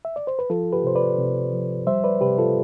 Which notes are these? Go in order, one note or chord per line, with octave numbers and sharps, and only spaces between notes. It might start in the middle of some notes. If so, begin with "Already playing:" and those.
E5
D5
C5
B4
F3 F4 A4
G4 B4
C3 C5
B4 D5
C3
F3
G3 C5 E5
B4 D5
C3 G4 B4
F4 A4